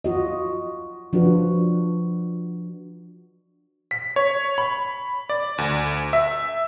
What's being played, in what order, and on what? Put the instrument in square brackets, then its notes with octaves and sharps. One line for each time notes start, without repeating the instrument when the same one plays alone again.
[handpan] F4 F#4 D#5
F3 D4 F4 F#4 B4
[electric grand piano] B6
C#5
B5
D5
D2
E5